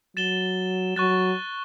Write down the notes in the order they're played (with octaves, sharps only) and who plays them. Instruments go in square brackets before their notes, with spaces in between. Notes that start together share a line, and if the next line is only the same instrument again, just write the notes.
[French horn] F#3 [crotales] A6 E7 G7
[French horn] F#3 [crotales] C#6 F#6 A6